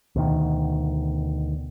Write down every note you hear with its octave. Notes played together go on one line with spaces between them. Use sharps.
D2 B2 D#3